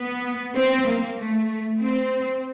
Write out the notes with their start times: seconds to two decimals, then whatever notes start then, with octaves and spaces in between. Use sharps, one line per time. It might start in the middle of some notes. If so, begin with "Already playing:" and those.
Already playing: B3
0.56 C4
0.86 A#3
1.18 A3
1.80 C4